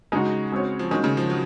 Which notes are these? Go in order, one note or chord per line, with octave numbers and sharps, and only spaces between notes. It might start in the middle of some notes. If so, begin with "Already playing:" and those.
C#3 G#3 D#4 F#4
G#3 C4 F#4 C#5
F3
D#3 G#3 C#4 F#4 C#5
C#3
F3
F#3 F#4